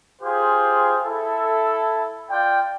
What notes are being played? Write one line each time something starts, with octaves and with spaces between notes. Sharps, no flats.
F4 G4 G#4 C5
E4 A4
F4 D5 G5